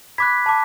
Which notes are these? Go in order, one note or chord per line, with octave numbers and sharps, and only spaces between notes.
B5 D6 F#6 G#6 B6
A5 D6